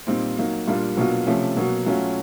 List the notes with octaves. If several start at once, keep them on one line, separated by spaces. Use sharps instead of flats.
A#2 G3 C4 D#4
F#3 A#3 D#4
A#2 G3 A#3 D4 F4
B2 F#3 A#3 D4 F4
C3 F3 A3 C#4
B2 F#3 A#3
F#3 A3 C#4 F4